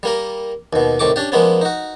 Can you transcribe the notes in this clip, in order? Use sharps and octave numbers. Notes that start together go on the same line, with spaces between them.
G3 A#3 A#4
D#2 B2
C2 A2 D#3 C#6 D6
C#4 D4 G4
F3 G#3 A#3 B3 C#4
D#4 F#4